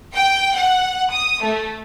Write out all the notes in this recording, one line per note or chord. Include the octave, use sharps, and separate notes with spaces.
G5
F#5
D#6
A3